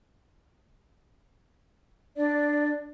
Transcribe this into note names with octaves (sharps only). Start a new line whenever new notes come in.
D4 D5